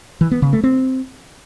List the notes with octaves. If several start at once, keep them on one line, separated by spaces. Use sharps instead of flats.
E3
B3
C#3
A3
C4